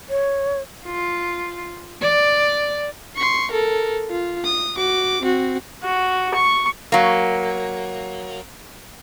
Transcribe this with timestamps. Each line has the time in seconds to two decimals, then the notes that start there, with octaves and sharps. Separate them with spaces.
0.10 C#5
0.86 F4
2.02 D5
3.16 C6 C#6
3.51 A4 A#4
4.09 F4
4.44 D#6
4.76 F#4 D6
5.22 C4 F#4
5.83 F#4
6.34 C#6
6.92 F#3 A#3